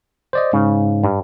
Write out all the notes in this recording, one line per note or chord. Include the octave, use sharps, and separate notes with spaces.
C5 D5 D#5
G#2 C#3
G2